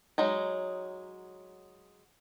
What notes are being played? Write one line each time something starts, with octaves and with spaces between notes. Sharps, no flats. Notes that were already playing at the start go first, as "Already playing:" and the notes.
F#3 G#3 D#4